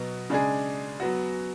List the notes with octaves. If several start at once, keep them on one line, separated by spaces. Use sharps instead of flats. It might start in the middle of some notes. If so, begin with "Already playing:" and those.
Already playing: B2 F#3 B3 F#4
C#3 G#3 D4 G#4
F#3 B3 F#4